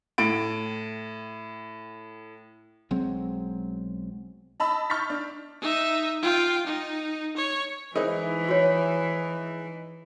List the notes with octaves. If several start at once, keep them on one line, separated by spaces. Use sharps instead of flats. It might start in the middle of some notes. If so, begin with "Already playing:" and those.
A2 D7
B1 F#3 G#3 C4
D#5 A5 B5 E6
C#6 F6 G6 A6 B6
D4
D#4 E5
F4 G5
D#4
C#5
E3 G#3 D#4 E4 A#4 C5
F#4 C#5